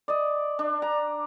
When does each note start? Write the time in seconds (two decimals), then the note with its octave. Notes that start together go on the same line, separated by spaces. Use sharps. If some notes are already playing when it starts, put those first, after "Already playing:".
0.08 D5 D#5
0.59 D4
0.82 A#5